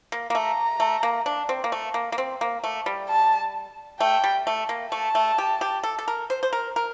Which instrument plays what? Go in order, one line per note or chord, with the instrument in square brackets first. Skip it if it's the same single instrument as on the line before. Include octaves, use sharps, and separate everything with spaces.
[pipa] A#3
A#3
[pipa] A3 [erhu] A#5
[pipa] A3
A#3
D4
C4
A#3
A3
A#3
A#3
C4
A#3
A3
G3
[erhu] A5
[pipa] A3 [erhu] G5
[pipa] G3
A3
A#3
[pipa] A3 [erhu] A5
[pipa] A3
G4
G4
A4
A4
A#4
C5
C5
A#4
A#4